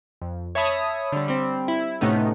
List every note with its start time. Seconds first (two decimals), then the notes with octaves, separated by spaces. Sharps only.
0.22 F2
0.55 C#5 E5 A5 B5 D#6
1.12 D3 G3
1.28 G3 C4
1.68 E4
2.01 A2 C3 A3 B3 C#4 D#4